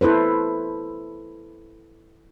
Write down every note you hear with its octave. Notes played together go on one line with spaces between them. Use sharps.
E4 A4 B4 C5